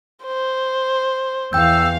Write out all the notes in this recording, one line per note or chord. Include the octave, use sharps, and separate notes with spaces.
C5
E2 F5 G5 E6 G6